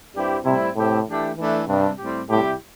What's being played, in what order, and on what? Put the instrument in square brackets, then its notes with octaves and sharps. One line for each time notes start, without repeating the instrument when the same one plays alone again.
[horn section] G2 G3 C4 E4 G4
[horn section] A2 G3 C4 E4 [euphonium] C3
[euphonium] A2 [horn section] C3 A3 C4 E4 G4
[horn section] E3 A3 D4 G4
E3 A3 D4
[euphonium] G2 [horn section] C3 G3 D4
[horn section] A2 G3 C4 G4
[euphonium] A2 [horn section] C3 G3 E4 G4